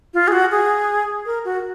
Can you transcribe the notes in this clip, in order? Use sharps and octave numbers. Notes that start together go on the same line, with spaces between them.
F4
G#4
F#4
G#4
A#4
F#4